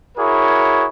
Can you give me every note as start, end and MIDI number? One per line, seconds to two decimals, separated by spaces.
0.17 0.87 64
0.17 0.87 66
0.17 0.87 68
0.17 0.87 70
0.17 0.87 73